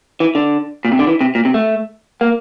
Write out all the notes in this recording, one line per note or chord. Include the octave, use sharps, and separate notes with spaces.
E3
D3
A#2
C3
D3
E3
C3
A#2
C3
A3
A#3